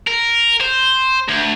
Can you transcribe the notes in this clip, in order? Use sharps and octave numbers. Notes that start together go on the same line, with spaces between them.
A#4
C5
D2